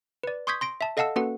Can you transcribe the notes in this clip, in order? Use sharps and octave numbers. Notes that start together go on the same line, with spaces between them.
B4 D5
C6 C#6 D#6 G6 G#6 B6
C6 A#6 D7
E5 A5
A4 D#5 F5 F#5 A5 E6
A#3 C#4 F#4 A4 B4 F#5